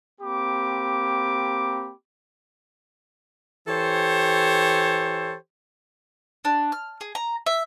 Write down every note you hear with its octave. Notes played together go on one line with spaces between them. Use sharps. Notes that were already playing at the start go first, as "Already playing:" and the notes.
A#3 C4 G4 B5 D6
E3 G4 A4 C5 C#5
D4
F6
G#4
A#5
E5